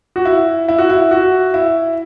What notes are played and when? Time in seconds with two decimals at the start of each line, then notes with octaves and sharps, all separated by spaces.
0.16 F#4
0.25 E4
0.68 E4
0.78 F#4
0.90 E4
1.11 F#4
1.54 E4